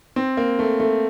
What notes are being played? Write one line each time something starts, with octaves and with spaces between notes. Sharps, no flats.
C4
A#3
A3
A3